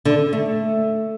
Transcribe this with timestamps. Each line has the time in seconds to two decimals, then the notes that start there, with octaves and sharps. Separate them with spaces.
0.05 D3
0.33 A3